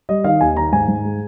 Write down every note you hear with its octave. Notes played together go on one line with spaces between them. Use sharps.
G3 D#5
D#3 F5
D#2 G#5
D#3 A#5
G#2 G#5
G#2
G#3